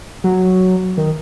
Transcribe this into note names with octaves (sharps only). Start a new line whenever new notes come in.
F#3
D#3